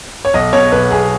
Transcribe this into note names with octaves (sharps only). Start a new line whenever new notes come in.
C#5
B1 D#5
B2 C#5
B1 B4
B1 G#4